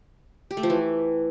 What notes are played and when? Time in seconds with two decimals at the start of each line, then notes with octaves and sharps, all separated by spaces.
0.51 G4
0.57 A3
0.63 F3
0.70 E3